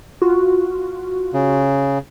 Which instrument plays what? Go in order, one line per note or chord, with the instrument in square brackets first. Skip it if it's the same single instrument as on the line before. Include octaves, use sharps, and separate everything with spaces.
[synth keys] F4 F#4
[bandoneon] C#3